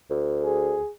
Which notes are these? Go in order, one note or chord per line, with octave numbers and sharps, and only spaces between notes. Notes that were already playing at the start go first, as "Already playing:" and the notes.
D2
G#4